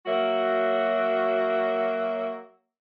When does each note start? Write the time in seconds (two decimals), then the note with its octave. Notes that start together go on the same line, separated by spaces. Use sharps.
0.06 F#3 A#3 F#4 A#4 C#5 E5